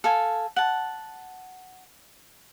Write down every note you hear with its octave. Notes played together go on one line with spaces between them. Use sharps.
A4 F5 G#5
F#5 A5